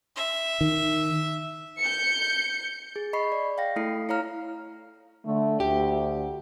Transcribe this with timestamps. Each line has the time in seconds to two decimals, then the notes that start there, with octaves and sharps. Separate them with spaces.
0.16 E5
0.61 D#3
1.79 G6 C#7
2.96 G#4
3.13 D#5 B5 C#6 C7
3.32 D5
3.58 F5 G5 A#6
3.76 A3 E4 A4 C7
4.09 E4 C#5 F5 A#5 F6
5.26 D3 A3
5.60 D2 G4